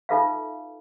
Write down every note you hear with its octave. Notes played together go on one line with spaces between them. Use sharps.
D#4 F4 A4 B4 E5 F5